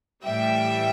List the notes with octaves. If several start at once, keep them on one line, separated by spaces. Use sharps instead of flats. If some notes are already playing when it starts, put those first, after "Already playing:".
A2 E3 G3 E5 G5